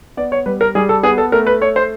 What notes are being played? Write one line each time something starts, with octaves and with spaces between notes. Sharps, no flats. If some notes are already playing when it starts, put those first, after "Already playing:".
B3 D5
C#5
G3 B4
A#4
G3 G#4
A4
B3 G#4
A4
A3 A#4
B4
A3 C#5
C5